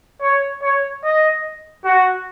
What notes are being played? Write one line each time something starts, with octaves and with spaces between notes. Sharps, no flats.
C#5
C#5
D#5
F#4